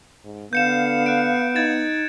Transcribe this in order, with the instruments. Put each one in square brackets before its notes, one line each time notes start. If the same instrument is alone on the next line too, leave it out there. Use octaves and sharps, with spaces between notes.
[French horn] G#2
[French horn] D3 [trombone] B3 [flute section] F5 [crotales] G6 C#7 E7
[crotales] F#6 D7
[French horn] D#4 [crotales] G#6 A6 E7